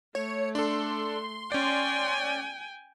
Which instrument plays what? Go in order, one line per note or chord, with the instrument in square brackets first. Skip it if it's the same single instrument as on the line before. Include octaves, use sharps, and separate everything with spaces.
[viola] A3 [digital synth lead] C#5
[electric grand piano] D4 A4 [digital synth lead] C6
[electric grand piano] C#4 D5 [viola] G5 G#5